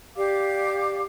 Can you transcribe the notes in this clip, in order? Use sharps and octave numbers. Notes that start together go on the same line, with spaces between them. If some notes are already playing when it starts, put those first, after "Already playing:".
G4 D5 F5 D6